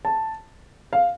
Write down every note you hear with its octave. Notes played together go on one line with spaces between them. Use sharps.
A5
F5